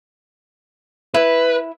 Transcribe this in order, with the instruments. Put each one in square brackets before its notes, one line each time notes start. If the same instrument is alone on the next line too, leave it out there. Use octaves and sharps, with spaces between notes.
[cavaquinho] E4 [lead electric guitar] B4